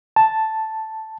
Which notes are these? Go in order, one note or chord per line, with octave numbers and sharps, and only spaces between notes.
A5